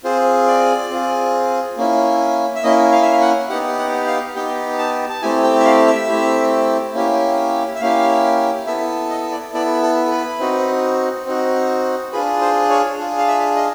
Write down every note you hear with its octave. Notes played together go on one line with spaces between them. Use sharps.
C4 F4 G#4 C5
D5
C4 F4 G#4
A#3 C#4 E4
E5
A#3 C#4 E4 D#5
F5
E5
F5
F#5
B3 D#4 G4 F#5
F#5
F5
B3 D#4 G4 G5
A5
A5
A3 C4 E4 G4 G#5
G5
E5
F5
E5
A3 C4 E4 G4
A#3 C#4 E4 G4
E5
A#3 C#4 E4 G4 F5
B3 E4 A4 E5
D#5
D5
B3 E4 A4 D5
A4
B4
C4 D#4 F#4
C4 D#4 F#4
D4 F4 G#4 B4
C5
C#5
D4 F4 G#4
F5
E5
D#5